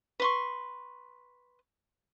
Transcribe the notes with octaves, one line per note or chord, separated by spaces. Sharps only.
B4 C6 C#6